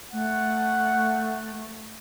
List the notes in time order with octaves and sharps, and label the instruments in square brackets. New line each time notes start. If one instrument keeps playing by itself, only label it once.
[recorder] A3 [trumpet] F#5